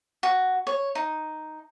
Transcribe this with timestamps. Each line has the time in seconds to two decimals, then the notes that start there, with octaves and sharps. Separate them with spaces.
0.23 F#4
0.67 C#5
0.95 D#4